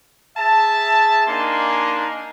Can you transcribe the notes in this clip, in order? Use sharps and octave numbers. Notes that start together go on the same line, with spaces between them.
G#4 E5 A5
A#3 D4 D#4 G#5 C6